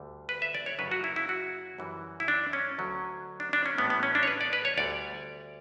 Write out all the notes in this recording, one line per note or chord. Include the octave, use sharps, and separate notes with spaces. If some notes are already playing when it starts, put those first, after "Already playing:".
Already playing: D2 D3 G3
B4
E5
D5
C#5
F#2 C#3 F#3 B4
F#4
E4
E4
F#4
F#2 E3 G3
E4
D4
C#4
D2 D3 F#3
D4
D4
C#4
A2 E3 G3 B3
B3
C#4
D4
C#5
B4
D5
B4
C#5
D2 D3 G3 D5